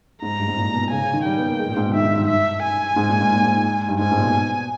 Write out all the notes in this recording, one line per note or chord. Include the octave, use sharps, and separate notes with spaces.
G#2 A#5
G2
G#2
A#2
B2
C#3 G#5
C#3
D#3
G3 G5
B3
A#3
G#3
A#2
G#2
B2
D#3 E5
D#3
G2
G2 E5
G#5
G#2
A#2
G#2
A#2
G#2
G2
G#2 G#5
G#2
A#2
B2